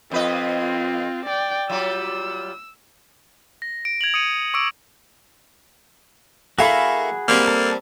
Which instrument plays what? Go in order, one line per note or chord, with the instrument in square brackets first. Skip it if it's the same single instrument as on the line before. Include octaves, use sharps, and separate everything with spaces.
[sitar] F2 B4 D#5 [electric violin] C4 F4
[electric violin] D5 G5
[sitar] F#3 G3 F4 [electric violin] E6
[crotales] A#6
D7
G#6 F7 F#7
D#6 C#7 D#7
C#6 D6 E6 D7
[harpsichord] A#3 E4 A4 [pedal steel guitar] F#4 G#4 B5
[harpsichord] G3 C4 [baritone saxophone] A#3
[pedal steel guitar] A4